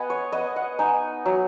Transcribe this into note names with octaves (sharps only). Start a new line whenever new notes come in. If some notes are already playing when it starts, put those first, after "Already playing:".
Already playing: B3 D#5 F#5 G#5
C#5
B3 D#5
F#5
D#4 G#5
F#3